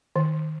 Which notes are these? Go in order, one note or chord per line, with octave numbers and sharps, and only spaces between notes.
D#3